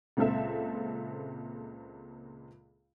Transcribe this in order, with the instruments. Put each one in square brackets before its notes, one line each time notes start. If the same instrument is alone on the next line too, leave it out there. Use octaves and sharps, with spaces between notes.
[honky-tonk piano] C#2 A#2 C4 A4 E5